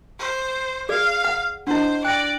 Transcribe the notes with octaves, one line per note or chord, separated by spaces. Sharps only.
C5
G#4 D5 F5
F#5
D4 E4 C5 D#5 F#5
D5 G5 F#6 A#6